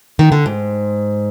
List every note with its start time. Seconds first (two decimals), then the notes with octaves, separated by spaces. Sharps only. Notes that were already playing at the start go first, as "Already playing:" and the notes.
0.19 D#3
0.32 D3
0.46 G#2